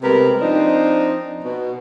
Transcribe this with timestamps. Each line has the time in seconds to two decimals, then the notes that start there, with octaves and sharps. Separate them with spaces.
0.03 C3 G3 G#3 B3 A#4
0.41 F3 C4 D4 D#4
1.43 B2